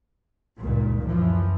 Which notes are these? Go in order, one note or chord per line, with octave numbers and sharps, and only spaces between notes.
F#1 C#2 G2 A#2 D#3
F#2 E3 F3